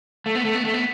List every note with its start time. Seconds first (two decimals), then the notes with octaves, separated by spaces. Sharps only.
0.26 A3
0.35 B3
0.45 A3
0.55 B3
0.65 A3
0.74 B3